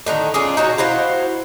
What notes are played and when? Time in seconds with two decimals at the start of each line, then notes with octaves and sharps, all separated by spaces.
0.06 A2 D3 D#3 A#5
0.34 C#4 D4 F4 G#4
0.57 D#4 F#4 A#4 C#5
0.78 E4 F#4 C5 F5